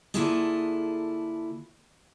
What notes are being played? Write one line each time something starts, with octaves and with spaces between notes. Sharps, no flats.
D3 A#3 E4 F4 G#4 A4